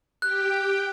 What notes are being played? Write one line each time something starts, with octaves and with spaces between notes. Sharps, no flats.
G4 G5 F#6